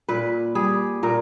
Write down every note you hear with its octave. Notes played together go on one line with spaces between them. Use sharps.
A#2 B4
G3 G#4
A#2 A#4